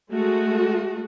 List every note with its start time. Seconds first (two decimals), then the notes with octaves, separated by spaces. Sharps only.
0.10 G#3 A3 F#4